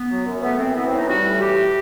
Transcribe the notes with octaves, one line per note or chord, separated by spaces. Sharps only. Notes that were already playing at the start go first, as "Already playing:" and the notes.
Already playing: B3
F#3
F#2
A3 B3
F#2 C4
E3 B3
C4
A2 D#4
G3 F#4
A2
E3 G4